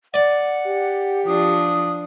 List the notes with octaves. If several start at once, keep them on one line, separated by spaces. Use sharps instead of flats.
D5 F#5
G4
F3 D4 D#6